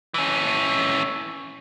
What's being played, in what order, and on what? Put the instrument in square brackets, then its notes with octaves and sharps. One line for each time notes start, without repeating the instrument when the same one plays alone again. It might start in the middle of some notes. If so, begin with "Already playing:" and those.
[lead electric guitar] E3 C#4